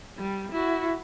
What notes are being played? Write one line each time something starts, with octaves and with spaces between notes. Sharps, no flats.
G3
E4 F#4